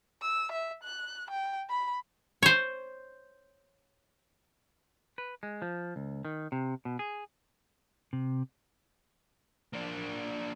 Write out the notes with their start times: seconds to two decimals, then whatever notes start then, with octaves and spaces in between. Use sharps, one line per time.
0.22 E6
0.52 E5
0.83 F#6
1.31 G5
1.70 B5
2.43 C5 C#5
5.18 B4
5.43 G#3
5.62 F3
5.96 C#2
6.25 D#3
6.52 C3
6.85 B2
6.99 G#4
8.13 C3
9.74 A#3 D4